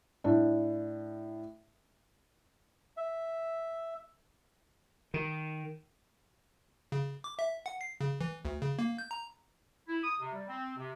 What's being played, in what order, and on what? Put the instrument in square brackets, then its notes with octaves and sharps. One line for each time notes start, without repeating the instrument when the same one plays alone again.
[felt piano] A2 D4
[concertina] E5
[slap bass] D#3
[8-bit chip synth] C#3
D6
E5
F#5
C7
C#3
E3
D2
C#3
A#3
G6
A#5
[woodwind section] E4
D#6
C3
G3
C4
C3